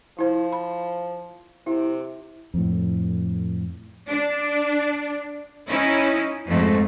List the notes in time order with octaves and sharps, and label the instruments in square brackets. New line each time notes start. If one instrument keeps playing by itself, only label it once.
[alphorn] F3 [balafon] E4 C5
[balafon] B5
[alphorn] C3 [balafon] E4
[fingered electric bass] F2 A2
[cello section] D4
C#4 D#4 E4
F2 G#2 A3